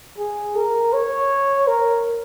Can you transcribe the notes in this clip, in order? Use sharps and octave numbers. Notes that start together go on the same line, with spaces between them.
G#4
A#4
C#5
A#4